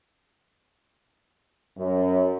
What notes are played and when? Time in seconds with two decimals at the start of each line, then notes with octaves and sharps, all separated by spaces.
1.78 F#2